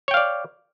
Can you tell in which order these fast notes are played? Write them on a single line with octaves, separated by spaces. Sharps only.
C#5 G5 F5 D5